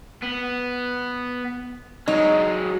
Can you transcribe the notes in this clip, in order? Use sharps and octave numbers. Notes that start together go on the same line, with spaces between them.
B3
F#3 G#3 D#4